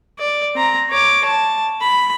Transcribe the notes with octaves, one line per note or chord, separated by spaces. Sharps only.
D5
C4 A#5
C#5 D6
A5
B5